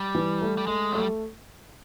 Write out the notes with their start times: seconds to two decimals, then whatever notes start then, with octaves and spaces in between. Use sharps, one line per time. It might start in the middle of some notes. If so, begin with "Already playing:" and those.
Already playing: G3
0.15 E3
0.41 A3
0.58 G3
0.67 G#3 A3
0.92 F#3
0.95 A3
1.00 G3